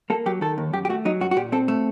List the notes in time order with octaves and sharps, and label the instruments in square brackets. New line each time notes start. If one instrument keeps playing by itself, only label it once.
[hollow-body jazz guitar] A#3 A4
F#3 G4
D#3 A4
D#2
F#2 G4
G4
A3 F#4
F#3 D#4
F#2 F#4
F#4
A#2 G4
C4 A4
A3 A4